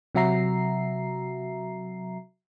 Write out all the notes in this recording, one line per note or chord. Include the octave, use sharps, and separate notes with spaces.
C3 F#3 F#4 E5 A#5 C7